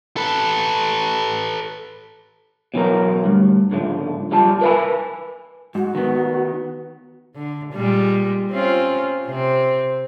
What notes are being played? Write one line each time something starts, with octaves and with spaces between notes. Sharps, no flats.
A4 B4
B2 E3 F#3 A#4
D2 G2
C#2 G#2 D3 F3
G#2 G3 F4 A5
A#4 B4 D#5 G5 G#5 B5
G#2 F#4
D#3 B3
D3
A#2 G3 G#3
C4 C#4 F4
C3 C4